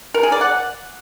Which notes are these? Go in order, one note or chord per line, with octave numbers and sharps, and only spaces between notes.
A#4
G#4
D5
F#5